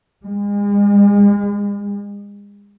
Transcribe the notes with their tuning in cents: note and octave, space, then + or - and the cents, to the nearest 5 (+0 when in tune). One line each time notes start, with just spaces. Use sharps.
G#3 -35